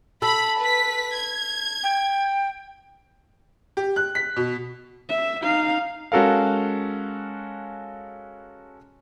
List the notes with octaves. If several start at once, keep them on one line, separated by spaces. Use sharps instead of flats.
A4 B5
B4 B6
G#6
G5
G4
F#6
B6
B2
E5
D#4 F5
G#3 C#4 F#4 A4 A#4 F5